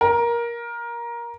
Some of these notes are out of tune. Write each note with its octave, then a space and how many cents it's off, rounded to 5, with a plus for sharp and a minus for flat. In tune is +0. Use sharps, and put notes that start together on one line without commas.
A#4 +15